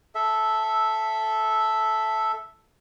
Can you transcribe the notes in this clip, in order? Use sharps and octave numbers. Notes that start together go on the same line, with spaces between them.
A4 E5